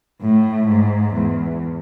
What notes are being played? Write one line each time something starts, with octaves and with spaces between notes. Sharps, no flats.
A2
G#2
E2